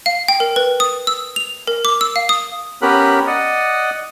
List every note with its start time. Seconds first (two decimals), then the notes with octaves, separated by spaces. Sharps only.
0.06 F5
0.28 G5
0.40 A#4
0.56 B4
0.80 D#6
1.07 E6
1.36 F7
1.67 A#4
1.85 D6
2.01 E6
2.16 F5
2.29 D#6
2.82 B3 C#4 G4 A#4 B5 F#6
3.27 D5 D#5 F#5